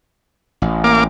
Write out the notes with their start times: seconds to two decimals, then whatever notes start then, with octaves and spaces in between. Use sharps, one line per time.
0.62 A1
0.84 A#3 D6